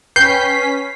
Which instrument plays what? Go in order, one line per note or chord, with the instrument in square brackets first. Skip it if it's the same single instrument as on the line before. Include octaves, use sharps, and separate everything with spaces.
[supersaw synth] C#4 B6 [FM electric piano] B4 G5 [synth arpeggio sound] G6 [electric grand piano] C7